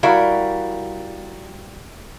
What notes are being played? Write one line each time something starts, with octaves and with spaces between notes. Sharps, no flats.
G3 E4 F#4 A#4 E5 F5